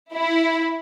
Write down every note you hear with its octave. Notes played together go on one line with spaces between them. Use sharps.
E4